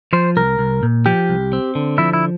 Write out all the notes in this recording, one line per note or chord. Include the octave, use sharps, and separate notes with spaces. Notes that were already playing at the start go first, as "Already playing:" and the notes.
F3 C5
C2 A#4
C2
A#2
F3 G4
C2
C4
D3
F3 E4
E4